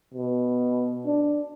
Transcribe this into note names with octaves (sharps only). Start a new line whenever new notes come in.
B2
D4